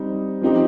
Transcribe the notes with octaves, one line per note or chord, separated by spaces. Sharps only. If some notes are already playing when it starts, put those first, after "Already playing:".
Already playing: G3 C4 D#4
F3 C4 D#4 G4